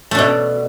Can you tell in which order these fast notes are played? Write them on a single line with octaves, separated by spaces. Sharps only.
A3 D4 B2